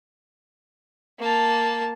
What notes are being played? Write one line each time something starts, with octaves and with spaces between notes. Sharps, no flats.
A#3 A5